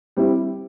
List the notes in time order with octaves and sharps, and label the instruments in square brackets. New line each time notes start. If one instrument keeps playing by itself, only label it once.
[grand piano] G3 C4 E4